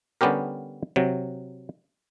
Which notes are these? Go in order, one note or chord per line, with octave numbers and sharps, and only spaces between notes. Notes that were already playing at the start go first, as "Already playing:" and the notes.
D3 G3 B3 C#4 G4 A#4
C3 F#3